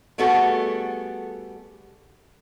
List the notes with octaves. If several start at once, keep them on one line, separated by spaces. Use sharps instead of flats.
G3 A3 B3 F#4 G#4 A4